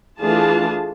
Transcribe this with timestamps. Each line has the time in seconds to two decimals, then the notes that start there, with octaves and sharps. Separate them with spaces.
0.19 E3 A3 D4 F4 G#4 A5